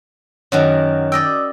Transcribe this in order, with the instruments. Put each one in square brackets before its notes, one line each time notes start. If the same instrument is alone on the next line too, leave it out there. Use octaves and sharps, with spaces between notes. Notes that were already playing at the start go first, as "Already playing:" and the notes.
[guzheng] F#2 D#3 F#3 [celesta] C#5 D#5
[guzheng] D5 D#5 G5 [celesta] E6